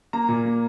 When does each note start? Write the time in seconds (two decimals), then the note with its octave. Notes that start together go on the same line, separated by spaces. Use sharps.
0.13 A#3 A#5
0.29 A#2
0.45 A#3